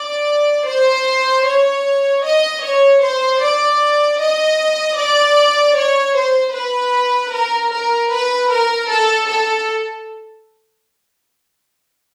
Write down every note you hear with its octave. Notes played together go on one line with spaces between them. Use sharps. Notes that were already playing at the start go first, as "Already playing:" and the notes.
Already playing: D5
C5
C#5
D#5
C#5
C5
D5
D#5
D5
C#5
C5
B4
A#4
A#4
B4
A#4
A4
A4